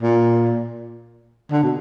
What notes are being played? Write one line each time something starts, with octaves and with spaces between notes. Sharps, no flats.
A#2
D3
B2